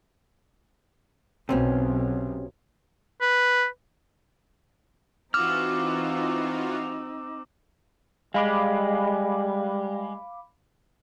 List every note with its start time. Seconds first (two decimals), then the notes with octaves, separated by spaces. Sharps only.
1.49 B1 C3 C4 C#4
3.21 B4
5.34 E3 C4 D#4 F4 F#4 D6 E6 F6
8.34 G3 G#3 F5 B5 D6